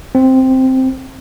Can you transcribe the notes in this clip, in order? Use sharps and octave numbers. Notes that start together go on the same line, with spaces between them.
C4